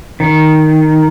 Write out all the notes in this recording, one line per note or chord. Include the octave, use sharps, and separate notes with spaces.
D#3